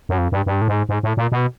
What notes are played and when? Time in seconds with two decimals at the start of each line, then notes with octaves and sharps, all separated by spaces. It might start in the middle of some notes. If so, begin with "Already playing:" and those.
0.09 F#2
0.18 F2
0.32 G2
0.46 G2
0.62 A2
0.68 G#2
0.89 G#2
1.03 A2
1.17 A#2
1.32 B2